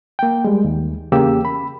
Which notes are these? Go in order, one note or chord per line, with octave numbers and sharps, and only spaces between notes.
A#3 G5
G3 G#3
D#2
E2 C#3 A#3 G4 E6
B5